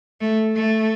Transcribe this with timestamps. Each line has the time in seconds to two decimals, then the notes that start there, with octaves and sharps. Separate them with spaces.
0.21 A3
0.56 A3